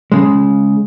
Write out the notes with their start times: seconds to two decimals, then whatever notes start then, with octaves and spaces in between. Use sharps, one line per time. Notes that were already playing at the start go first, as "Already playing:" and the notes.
0.12 C#3 G#3